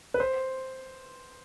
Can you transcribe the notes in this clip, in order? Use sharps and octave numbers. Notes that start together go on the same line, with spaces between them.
B4
C5